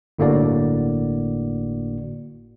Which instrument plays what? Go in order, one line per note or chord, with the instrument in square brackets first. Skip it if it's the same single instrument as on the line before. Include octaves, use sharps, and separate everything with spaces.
[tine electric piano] G1 A2 D3 A#3 F#4 D5